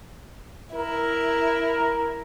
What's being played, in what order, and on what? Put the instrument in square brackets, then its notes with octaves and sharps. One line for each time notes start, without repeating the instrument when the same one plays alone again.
[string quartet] E4 [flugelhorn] A#4